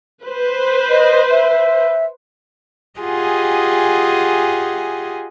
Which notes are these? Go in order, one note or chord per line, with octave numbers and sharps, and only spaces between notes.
B4 C5
D#5
E5
F4 G4 G#4 D#5 F#5 G#5